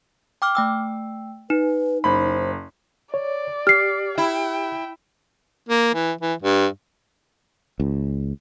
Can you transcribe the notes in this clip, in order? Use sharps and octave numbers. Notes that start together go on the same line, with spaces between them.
G5 D6 F6
A3 G5 E6
D#4 B4
F#1 C5 B5
C#5 D5
G4 F6 C7
E4 G5
A#3
E3
E3
G2
C#2